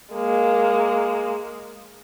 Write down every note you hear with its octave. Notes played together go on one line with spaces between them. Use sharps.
G#3 A#3